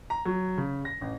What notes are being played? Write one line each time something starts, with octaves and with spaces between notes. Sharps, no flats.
A#5
F#3
C#3
A#6
A1